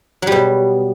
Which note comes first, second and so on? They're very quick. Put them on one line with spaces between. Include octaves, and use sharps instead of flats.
F#3 G3 B2